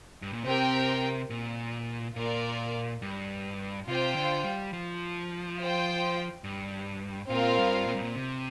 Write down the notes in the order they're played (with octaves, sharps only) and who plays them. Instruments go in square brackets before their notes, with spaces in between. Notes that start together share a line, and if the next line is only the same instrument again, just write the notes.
[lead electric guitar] G2
A#2
[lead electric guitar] C3 [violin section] C4 G4 A#4 G5
[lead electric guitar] A#2
[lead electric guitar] A#2 [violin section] F4 A#4 D5
[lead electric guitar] G2
[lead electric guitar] C3 [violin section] F4 C5 G5
[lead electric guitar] D3
G3
F3
[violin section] F4 C5 G5
[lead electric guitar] G2
[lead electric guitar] A#2 [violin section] C4 F4 A#4 F5
[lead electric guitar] G2
A#2
G2
A#2
C3